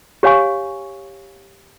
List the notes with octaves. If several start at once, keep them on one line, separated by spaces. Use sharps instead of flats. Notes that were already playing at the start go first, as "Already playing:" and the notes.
G4 C#5 F5 G#5 C#6